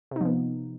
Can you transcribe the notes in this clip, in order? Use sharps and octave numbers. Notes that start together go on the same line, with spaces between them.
C3 F3 B3 D#4